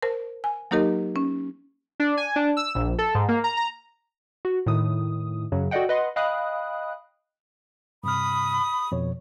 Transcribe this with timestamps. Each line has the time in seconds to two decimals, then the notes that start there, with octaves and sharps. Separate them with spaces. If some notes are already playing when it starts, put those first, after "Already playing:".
0.02 A#4 C5 A5
0.44 G#5
0.71 F#3 A#3 D#4 G4 A#4 D#5
1.16 C#4
2.00 D4
2.17 G#5
2.36 D4
2.57 E6
2.75 A#1
2.99 A4
3.15 G#2
3.29 A#3
3.44 A#5
3.57 A#5
4.45 F#4
4.66 A2 D#3 D#6
5.52 F#2 C#3 F#3
5.71 F#4 A4 D5 D#5 F#5 G5
5.89 B4 D#5 F#5 C6
6.16 D#5 F5 G5 B5 D#6 F#6
8.04 G2 C3 B5 D#6 F6
8.92 F2 B2 C#5